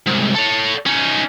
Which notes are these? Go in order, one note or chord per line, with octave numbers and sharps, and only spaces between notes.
C2 G#2
A4 C#5
C#4 D#4